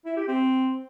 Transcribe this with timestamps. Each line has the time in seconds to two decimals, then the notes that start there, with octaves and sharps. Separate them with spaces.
0.06 E4
0.17 G4
0.28 C4